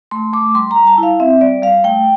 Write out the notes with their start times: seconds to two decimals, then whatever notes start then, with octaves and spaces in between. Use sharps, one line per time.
0.11 A3 C6
0.33 A3 D6
0.55 G3 C6
0.71 A#5
0.76 G3
0.87 A5
0.98 E4
1.03 F5
1.20 C4 E5
1.41 G3 D5
1.62 G3 F5
1.84 A3 G5